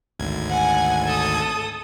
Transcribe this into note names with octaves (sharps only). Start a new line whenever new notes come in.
G#1 D2 G#6
F#5 G#5
A4 D#6